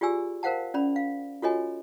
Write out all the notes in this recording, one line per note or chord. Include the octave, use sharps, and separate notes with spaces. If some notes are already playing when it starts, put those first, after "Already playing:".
F4 G4 G#4 D5 G#5 E6
A#4 C5 F5 F#5 A5
C#4 D5 B5
F5
F4 F#4 A4 C#5 D#5 G#5